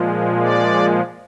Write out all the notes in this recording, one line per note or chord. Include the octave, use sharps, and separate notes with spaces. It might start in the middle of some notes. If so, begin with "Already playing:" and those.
Already playing: A#2 F3 G#3
D5